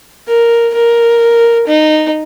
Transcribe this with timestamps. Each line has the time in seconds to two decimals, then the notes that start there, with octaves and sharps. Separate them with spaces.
0.27 A#4
0.74 A#4
1.67 D#4